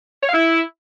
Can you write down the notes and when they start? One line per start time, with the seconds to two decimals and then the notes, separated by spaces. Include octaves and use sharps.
0.22 C#5
0.28 F5
0.33 E4